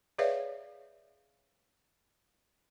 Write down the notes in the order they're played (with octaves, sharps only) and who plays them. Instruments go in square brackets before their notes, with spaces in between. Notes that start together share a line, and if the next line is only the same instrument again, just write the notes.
[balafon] G#4 B4 C#5 D5 E5 F5